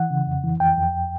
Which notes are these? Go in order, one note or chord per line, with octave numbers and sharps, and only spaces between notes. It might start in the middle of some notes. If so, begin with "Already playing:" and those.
Already playing: E3 F#5
C#3
F2
E3
F2 G5
F2